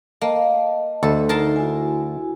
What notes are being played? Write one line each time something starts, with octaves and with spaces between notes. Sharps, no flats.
A#3 D#5 A5
D2 A4
D#4 A#4 A5 C6
E4 F#4 G#5